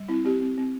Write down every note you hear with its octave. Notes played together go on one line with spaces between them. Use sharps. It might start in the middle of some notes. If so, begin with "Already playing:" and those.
Already playing: G3
C4 E4
C4 G4
C4
C4